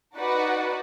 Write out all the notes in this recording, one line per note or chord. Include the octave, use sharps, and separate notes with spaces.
D#4 F#4 B4 D5 F#5